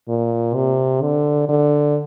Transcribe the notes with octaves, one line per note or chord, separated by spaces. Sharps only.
A#2
C3
D3
D3